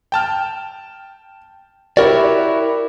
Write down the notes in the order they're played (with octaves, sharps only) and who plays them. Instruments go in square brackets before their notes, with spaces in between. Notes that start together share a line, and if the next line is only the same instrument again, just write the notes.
[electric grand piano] G5 A5 F6
[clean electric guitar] E4 A#4 D5 [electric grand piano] F#4 G4 C#5